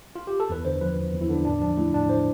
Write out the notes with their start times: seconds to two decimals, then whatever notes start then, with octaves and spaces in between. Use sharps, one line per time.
0.15 F4
0.27 G4
0.40 A4
0.49 E2 B4
0.65 D3 C5
0.81 F3 B4
0.97 E2
1.14 E2
1.21 E4
1.29 D3 D4
1.45 A2 D4
1.61 F3 D4
1.77 A3 E4
1.93 A2 D4
2.09 A2 C5